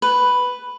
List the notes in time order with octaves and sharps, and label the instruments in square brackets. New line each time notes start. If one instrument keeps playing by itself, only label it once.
[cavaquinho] B4